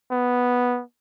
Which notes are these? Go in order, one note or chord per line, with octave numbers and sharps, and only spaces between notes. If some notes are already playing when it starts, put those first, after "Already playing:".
B3